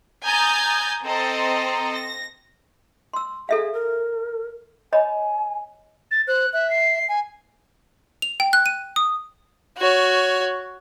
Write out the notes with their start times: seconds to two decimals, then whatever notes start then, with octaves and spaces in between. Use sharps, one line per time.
0.23 G#5 A#5 D#6 G6 A6
1.04 C4 A4 C5 D#5 A#5
1.94 A#6
3.13 C6 E6
3.49 G#4 A4 E5 F5
3.73 A#4
4.93 C#5 D#5 G#5 B5
6.11 A6
6.28 C5 F#6
6.53 E5 F#6
6.70 C7
7.08 G#5
8.22 F7
8.40 G5
8.53 F#6
8.66 D#7
8.96 D#6
9.78 F#4 C#5